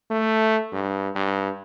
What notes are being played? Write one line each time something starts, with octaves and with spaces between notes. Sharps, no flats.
A3
G2
G2